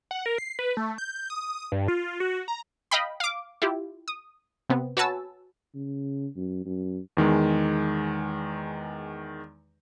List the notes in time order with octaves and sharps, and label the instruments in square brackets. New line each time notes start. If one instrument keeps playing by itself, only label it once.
[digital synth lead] F#5
A#4
C7
B4
A3
G6
D#6
G2
F4
F#4
A#5
[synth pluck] D#5 F5 G5 B5
F5 D6
E4 F4 G4
D#6
C3 B3 C4
F#4 B4 C#5 G#5 A5 E6
[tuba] C#3
F#2
F#2
[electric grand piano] E2 D#3 G#3